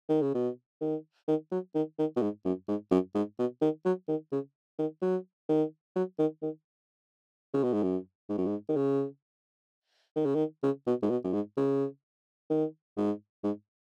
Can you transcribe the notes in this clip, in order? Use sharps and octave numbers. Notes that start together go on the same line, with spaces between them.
D#3
C#3
B2
D#3
D#3
F#3
D#3
D#3
B2
G#2
F#2
G#2
F#2
G#2
B2
D#3
F#3
D#3
C#3
D#3
F#3
D#3
F#3
D#3
D#3
C#3
B2
G#2
F#2
G#2
F#2
G#2
D#3
C#3
D#3
C#3
D#3
C#3
B2
G#2
B2
F#2
G#2
C#3
D#3
G#2
G#2